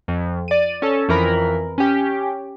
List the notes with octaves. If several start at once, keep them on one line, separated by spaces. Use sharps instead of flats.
F2
D5 D#7
C#4 A4
F2 E3 A#4 B5
C#4 G4